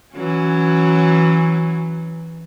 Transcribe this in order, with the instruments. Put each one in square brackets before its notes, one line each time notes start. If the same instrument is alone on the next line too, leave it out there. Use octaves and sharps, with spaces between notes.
[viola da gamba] E3 F#3 C#4